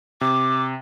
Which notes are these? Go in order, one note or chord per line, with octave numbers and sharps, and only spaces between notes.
C3 D6